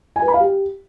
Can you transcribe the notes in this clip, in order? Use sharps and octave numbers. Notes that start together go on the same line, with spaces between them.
G#5
B4
B5
F5
G4